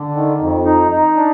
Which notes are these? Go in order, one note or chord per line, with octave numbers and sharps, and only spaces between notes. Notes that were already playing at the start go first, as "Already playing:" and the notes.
Already playing: D3
D#3
F2
D#4
D#4
D4